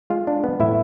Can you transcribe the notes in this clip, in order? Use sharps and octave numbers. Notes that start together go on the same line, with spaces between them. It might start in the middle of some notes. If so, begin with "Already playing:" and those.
G#3 F4 F5
D4
B3
A2 E4 E5